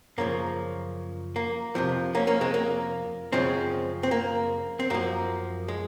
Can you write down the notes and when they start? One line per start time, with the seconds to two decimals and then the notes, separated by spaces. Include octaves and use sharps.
0.18 F#2 C#3 F3 A#3
1.36 A#3
1.75 F2 C3 F3
2.15 A#3 C#4
2.27 A#3 C#4
2.41 G#3 C4
2.54 A#3
3.32 F#2 C#3 F3 G#3 C4
4.03 C4
4.11 A#3
4.80 C4
4.90 F#2 F3 A#3
5.68 G#3